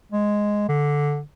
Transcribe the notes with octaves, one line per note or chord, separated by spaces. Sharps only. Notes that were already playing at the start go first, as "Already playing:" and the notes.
G#3
D3